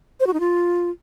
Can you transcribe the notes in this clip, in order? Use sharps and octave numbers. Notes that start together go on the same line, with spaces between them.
C5
F#4
D#4
F4